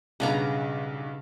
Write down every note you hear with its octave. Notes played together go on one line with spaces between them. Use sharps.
B1 G2 C#3 B3 A#5